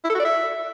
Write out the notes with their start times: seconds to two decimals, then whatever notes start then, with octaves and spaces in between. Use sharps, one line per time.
0.04 E4
0.09 A4
0.15 F#4
0.20 D5
0.25 E5